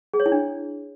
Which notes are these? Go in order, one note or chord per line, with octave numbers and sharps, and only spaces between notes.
G#4
C#5
E4
D4